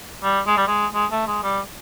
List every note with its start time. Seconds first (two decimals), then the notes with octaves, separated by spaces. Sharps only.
0.23 G3
0.47 G#3
0.57 G3
0.67 G#3
0.94 G#3
1.11 A3
1.27 G#3
1.43 G3